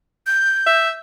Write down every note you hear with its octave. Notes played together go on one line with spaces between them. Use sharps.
G6
E5